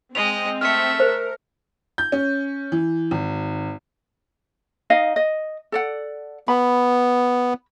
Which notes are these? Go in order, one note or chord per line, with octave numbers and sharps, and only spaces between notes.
G#3 C4 D#5 F7
A3 E5 F6 C#7
A#4 C5
G6
C#4
E3
G#1
D#4 D#5 F5
D#5
A4 D5 F#5
B3 B5